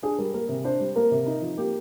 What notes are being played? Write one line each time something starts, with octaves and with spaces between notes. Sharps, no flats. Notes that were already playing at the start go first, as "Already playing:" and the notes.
D4 G#4
G3 A#4
A#3 A#4
C3
D4 C5
G3
A#3 A#4
C3
D#4
F3
A#3 G4